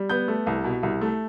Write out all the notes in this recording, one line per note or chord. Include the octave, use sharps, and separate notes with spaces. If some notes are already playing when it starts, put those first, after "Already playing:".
Already playing: G3
B3 G6
A3
C2
B2
C2
A3